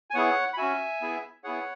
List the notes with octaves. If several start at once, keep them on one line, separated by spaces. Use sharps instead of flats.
G#5
B3 E4 G#4 C#5 F#5
B5
C#4 F#4 E5 G#5
B3 E4 G#4
B3 E4 G#4 C#5 F#5